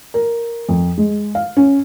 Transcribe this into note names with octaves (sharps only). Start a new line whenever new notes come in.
A#4
F2
G#3
F5
C#4